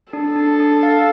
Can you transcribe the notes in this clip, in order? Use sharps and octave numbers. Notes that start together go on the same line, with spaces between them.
D4 A4
D4
D4
F5